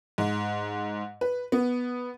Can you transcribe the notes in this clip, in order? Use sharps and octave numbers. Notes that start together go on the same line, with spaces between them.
G#2
B4
B3